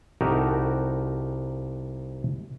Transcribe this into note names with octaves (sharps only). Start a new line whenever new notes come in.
C2 D#4 F#4 G4 A4 A#4